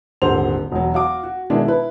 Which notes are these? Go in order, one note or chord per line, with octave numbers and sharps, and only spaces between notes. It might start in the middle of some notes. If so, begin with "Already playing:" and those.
D#1 G#1 D3 C5 F7
E1 F#3
F#4 F5 D6
F#4
B2 D#3 G#3 D4 E4
E4 B4